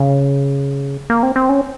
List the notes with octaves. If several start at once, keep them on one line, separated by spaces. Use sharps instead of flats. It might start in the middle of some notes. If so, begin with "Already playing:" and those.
Already playing: C#3
A#3
C4
C4
C#4